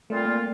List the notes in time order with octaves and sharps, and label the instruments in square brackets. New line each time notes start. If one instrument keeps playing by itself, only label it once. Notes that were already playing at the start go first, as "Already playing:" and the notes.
[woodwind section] A#2 G3 C4 F4 [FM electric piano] A3
[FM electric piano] A#3